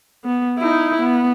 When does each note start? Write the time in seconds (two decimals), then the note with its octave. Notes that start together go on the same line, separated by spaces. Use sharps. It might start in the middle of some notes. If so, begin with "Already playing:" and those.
0.25 B3
0.59 D#4 E4
1.02 B3